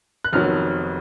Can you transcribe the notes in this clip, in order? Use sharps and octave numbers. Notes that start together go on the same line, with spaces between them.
F#6
F1 F2 D#3 F#3 B3 F6